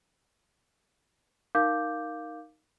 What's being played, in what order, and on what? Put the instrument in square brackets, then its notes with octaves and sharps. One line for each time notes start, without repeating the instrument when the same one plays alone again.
[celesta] D#4 A#4 F5 D6 G6